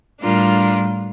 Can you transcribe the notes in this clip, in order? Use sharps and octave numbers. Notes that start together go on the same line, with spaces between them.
A2 G3 D4 F4 A#4